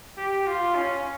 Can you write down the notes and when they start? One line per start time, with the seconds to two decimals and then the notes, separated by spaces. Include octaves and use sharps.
0.17 G4
0.47 F4
0.76 C#4